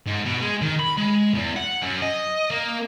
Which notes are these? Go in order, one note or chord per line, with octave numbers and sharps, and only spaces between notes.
G#2
B2
G#3
D#3
B5
G#3
E2
F#5
F#2
D#5
A#3